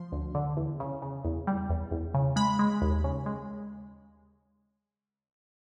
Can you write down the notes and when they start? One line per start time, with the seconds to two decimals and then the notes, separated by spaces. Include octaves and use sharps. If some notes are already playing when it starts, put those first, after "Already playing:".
Already playing: F3 C6
0.12 D2
0.35 D3
0.57 E2
0.80 C#3
1.02 C#3
1.25 E2
1.47 G3
1.70 E2
1.91 E2
2.14 C#3
2.36 G#3 B5
2.59 G#3
2.82 D#2
3.04 C#3
3.26 G#3